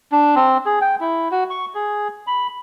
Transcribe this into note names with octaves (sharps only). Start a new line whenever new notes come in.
D4
C4
G#4
G5
E4
F#4
C#6
G#4
B5